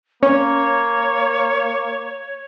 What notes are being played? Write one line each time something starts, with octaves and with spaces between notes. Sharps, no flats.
A#3 C#4 C#5